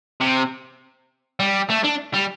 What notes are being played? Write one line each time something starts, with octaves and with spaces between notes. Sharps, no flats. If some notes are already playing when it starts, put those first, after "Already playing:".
C3
G3
A3
D4
G3